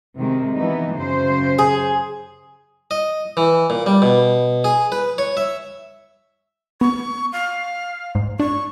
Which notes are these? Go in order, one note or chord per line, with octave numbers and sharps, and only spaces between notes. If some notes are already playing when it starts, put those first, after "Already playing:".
C3 D#3 G#3
E3 B3 D#4
F#2 C#3 C5
G#4
D#5
E3
A#2
G3
B2
G#4
B4
C#5
E5
B3 C#6
F5
G#2
D4 C#6